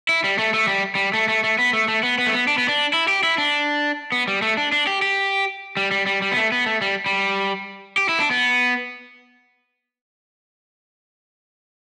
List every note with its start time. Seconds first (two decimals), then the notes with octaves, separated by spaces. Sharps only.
0.09 E4
0.24 G3
0.39 A3
0.54 A3
0.68 G3
0.95 G3
1.14 A3
1.28 A3
1.44 A3
1.59 B3
1.73 A3
1.88 A3
2.03 B3
2.18 B3
2.27 A3
2.33 B3
2.48 D4
2.58 B3
2.68 D4
2.93 E4
3.08 G4
3.23 E4
3.38 D4
4.12 B3
4.28 G3
4.42 A3
4.57 D4
4.72 D4
4.87 G4
5.02 G4
5.77 G3
5.91 G3
6.06 G3
6.22 G3
6.32 B3
6.37 A3
6.52 B3
6.66 A3
6.81 G3
7.06 G3
7.98 G4
8.09 E4
8.20 D4
8.31 B3